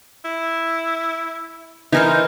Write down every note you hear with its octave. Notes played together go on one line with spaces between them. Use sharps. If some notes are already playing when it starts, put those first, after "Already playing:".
E4
E3 D#4 A#4 C5